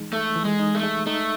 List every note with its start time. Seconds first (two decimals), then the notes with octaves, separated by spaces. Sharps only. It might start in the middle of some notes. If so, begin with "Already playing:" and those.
Already playing: E3 G#3 D#4
0.13 A3 A4
0.36 E3
0.45 G#3
0.59 D#4
0.75 A3
0.83 G#3
1.06 A3 D#4